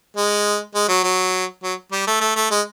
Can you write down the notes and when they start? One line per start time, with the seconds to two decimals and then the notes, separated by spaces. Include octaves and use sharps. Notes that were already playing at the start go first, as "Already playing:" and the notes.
0.17 G#3
0.75 G#3
0.89 F#3
1.04 F#3
1.63 F#3
1.92 G3
2.07 A3
2.21 A3
2.36 A3
2.51 G#3